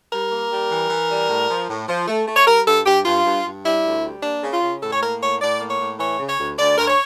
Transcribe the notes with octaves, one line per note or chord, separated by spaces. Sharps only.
G3 A#4
A#3
G3
E3
E3
G3
A2
F3
A2
F3
A3
A3
C#5
G3 A#4
G2 A4
G2 G4
G2 F4
G2
G2
G3 E4
D2
G3
A#3 D4
C#3
F4
C#3
A2 A4
C#5
A#3 A#4
A2 C#5
A2 D5
A#3
C#5
A2
E3 C#5
C#3
C#5
D2
D2 D5
D2 A#4
C#5